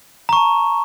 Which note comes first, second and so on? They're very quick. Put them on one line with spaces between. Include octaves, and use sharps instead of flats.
A#5 C#6 A5